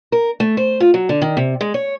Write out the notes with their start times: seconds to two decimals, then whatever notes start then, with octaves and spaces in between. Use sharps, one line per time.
0.12 A#4
0.40 A3
0.57 C5
0.80 F4
0.94 F#3
1.09 D3
1.22 D#3
1.37 C3
1.61 G#3
1.74 C#5